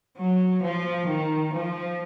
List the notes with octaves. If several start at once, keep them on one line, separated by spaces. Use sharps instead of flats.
F#3
F3
D#3
F3